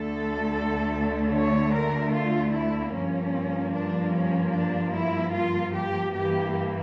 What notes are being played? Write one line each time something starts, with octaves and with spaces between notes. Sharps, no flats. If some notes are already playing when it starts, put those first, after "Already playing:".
Already playing: D2 D3 A3 A4
C#5
A#4
F4
E4
G2 F3 A#3 C#4
D4
C#4
D4
E4
F4
G4
G2 E3 A#3 G4